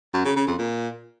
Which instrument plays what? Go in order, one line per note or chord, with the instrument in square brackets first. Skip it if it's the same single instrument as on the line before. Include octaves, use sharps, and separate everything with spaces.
[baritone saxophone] F#2
C#3
C#3
F2
A#2